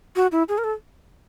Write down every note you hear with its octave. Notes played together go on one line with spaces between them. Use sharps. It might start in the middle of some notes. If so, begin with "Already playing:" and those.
F#4
E4
G#4
A#4
A4